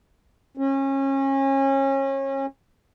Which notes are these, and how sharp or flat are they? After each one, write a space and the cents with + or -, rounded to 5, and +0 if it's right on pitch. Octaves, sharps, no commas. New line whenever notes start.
C#4 -30